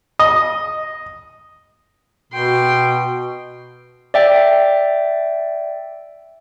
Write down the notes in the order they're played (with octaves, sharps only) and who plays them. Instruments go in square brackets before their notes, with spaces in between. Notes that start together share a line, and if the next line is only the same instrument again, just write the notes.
[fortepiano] D#5
[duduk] B2 [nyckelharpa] G5 C6
[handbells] D5 E5 G5